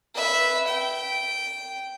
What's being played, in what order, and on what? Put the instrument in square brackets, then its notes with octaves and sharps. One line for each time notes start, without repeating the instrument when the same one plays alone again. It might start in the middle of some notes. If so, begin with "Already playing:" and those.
[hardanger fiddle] B4 E5
G5